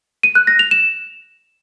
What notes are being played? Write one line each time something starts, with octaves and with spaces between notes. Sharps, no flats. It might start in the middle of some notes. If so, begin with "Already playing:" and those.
D#7
F#6
A#6
F7
E7